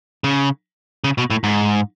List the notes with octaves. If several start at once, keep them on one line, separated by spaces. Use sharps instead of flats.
C#3
C#3
B2
A2
G#2